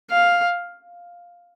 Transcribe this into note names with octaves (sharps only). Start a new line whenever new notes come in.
F5